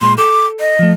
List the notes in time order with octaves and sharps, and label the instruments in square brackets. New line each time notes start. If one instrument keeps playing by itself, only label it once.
[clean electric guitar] A#2 G#3 B5 [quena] C6
[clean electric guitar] A4 [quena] D6
[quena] D#5
[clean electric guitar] F3 A3